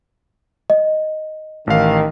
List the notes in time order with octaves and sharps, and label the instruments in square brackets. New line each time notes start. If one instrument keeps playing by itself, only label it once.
[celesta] D#5
[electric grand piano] A1 F5 [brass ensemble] D#3